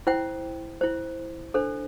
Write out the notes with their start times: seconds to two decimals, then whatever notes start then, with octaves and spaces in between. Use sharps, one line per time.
0.07 E4 C5 G5
0.81 E4 C5
1.54 D4 A4 C5